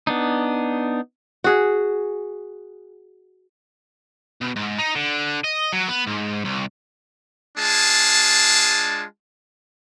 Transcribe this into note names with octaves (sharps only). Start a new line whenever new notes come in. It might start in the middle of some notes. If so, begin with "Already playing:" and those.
B3 D4 D#4
F#4 G#4
B2
G#2
D#4
D3
D#5
F#3
B3
G#2
C2
G#3 D4 F4 G#4 A5